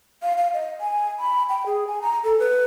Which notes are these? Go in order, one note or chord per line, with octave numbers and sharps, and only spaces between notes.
F5
F5
D#5
G#5
B5
G5
G#4
G#5
A#5
A4
B4